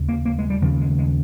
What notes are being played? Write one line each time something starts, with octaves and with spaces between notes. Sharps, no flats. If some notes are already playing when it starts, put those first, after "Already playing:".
Already playing: D#2 C#3
A#3
A#3
G#3
G3
D#2 C#3 F3
G#3
G#3